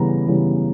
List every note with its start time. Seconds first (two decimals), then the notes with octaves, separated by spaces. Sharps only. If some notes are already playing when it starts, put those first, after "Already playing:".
Already playing: C#3 E3 G3 B3 A#5
0.28 C#3 E3 G3 B3